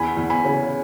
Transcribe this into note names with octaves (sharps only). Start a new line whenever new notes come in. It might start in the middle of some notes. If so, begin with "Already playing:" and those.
Already playing: E2 G#5 B5
E2
G#5 B5
C#3